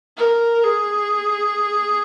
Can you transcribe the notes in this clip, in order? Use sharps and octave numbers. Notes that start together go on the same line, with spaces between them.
A#4
G#4